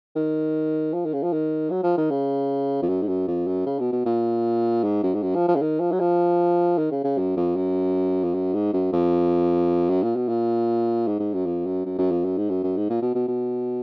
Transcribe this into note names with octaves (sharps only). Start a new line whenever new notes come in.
D#3
F3
D#3
C#3
F3
D#3
F#3
F3
D#3
C#3
F2
F#2
G#2
F#2
F2
F#2
C#3
B2
B2
A#2
G#2
F#2
G#2
F#2
F3
F3
C#3
D#3
F3
F#3
F3
D#3
C#3
C#3
F#2
F2
F#2
F2
F#2
G#2
F#2
F2
F#2
A#2
B2
A#2
G#2
G#2
F#2
F2
F#2
F#2
F#2
F2
F#2
G#2
F#2
F#2
G#2
A#2
B2
B2
B2